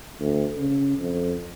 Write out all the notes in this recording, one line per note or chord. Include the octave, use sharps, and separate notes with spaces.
D2
C#3
F2